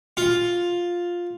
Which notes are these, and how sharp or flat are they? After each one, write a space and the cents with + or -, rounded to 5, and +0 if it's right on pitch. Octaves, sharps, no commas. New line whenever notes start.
F4 +5